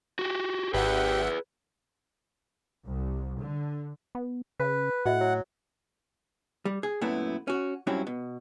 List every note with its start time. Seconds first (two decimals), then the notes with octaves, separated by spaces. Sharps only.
0.19 F#4 G4
0.74 G#1 G4 G#4 B4 E5 F#5
2.85 C2
3.39 D3
4.15 B3
4.59 C#3 B4
5.05 A2 F#4 D#5 E5 F#5
5.20 F#3
6.65 G3
6.83 G#4
7.01 F#2 A#2 F#3 A3 B3 E4
7.48 C#4 F#4
7.87 G2 F#3 C4 C#4 E4
8.07 B2